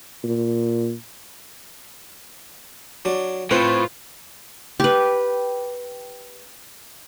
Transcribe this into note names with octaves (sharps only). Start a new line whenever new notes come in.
A#2
F#3 D4
A2 C4 F4 B4 C5
G4 B4